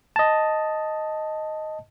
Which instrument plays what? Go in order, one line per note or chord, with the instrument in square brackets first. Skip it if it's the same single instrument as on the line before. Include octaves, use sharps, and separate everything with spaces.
[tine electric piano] D#5 A5